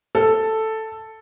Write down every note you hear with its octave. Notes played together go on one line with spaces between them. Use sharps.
A4